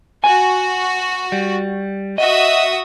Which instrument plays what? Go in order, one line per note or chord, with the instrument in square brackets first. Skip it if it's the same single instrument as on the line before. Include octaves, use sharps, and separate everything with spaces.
[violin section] F#4 [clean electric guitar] G#5
[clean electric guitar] G3
[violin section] F#4 E5 D#6 [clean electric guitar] D#5